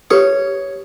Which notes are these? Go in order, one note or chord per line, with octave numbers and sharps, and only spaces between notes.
G4 B4 C#5 D#6